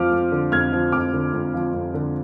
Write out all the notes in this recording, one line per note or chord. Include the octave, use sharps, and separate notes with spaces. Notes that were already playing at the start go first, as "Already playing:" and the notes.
Already playing: F2 F3 D6 F6
F2
D3
F2 F6 G#6
F3
F2 D6 F6
D3
F2
F3
F2
D3